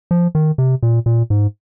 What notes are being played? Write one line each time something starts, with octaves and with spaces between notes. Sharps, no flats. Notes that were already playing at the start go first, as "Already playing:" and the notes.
F3
D#3
C3
A#2
A#2
G#2